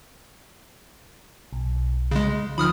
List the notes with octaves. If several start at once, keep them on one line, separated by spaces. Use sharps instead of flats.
B1
C#3 G#3
D2 D#3 F3 B5 D#6 F6